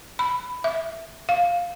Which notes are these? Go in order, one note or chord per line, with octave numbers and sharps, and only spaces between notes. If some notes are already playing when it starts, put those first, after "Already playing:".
B5
E5
F5